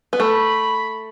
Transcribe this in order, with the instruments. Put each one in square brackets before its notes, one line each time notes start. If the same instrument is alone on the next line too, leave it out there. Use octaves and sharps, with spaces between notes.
[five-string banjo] B3
[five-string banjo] A3 [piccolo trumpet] B5